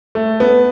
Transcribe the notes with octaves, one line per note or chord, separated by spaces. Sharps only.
A3
B3